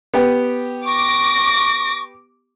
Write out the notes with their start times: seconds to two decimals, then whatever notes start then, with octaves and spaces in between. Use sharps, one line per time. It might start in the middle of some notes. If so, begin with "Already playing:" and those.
0.14 B3 G4
0.85 C#6 D6 A#6